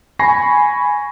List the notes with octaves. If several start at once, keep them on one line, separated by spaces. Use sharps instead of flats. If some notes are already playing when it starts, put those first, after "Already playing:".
G#5 B5 C#6 A#6 C7